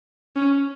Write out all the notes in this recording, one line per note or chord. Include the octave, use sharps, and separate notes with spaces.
C#4